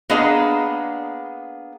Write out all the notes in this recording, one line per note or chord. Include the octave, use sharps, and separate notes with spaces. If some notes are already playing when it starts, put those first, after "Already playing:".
A#3 B3 D4 G#4 D#5 A#5